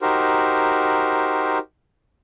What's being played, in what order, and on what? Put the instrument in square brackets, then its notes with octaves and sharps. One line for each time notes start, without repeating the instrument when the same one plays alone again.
[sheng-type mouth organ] D#4 F#4 G4 A#4 C5